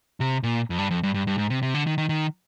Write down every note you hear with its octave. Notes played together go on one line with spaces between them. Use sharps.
C3
A#2
F2
G2
F2
G2
G2
G2
G#2
C3
C3
D3
D#3
D#3
D#3